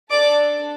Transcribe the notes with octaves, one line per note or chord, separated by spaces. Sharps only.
D4 A4 D5 D6